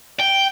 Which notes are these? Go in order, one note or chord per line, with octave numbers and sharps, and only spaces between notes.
G5